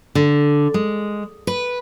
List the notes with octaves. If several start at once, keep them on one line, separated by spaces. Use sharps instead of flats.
D3
G#3
B4